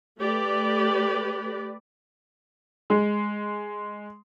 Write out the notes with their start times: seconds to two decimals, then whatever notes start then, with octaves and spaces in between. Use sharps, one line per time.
0.18 A3 G4 B4 D5
2.90 G#3